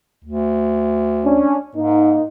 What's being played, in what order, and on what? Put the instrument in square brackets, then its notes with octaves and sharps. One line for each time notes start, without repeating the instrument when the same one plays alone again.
[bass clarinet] D2
[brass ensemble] C#4 D4
[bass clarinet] G#2 [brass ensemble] A#3 D#4